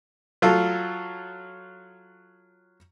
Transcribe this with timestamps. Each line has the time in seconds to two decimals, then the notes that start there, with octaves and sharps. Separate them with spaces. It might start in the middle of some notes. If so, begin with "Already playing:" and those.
0.42 F#3 F4 A4